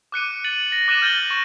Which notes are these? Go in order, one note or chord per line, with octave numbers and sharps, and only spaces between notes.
D6 F#6 C#7 D#7
F#6 A6 C#7 D#7 F#7
A#6
D6 F#6 A#6 D#7 E7 F#7
F6 G6 A6 D#7 G7
C#6